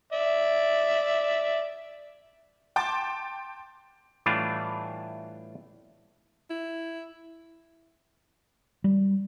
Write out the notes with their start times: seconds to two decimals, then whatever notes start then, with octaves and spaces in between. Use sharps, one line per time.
0.12 D5 E5
2.76 G5 A5 C6 D6 A6
4.26 A2 E3 G3 A3 D4 F4
6.50 E4
8.84 G3